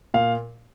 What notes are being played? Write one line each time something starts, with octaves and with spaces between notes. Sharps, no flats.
A#2 F5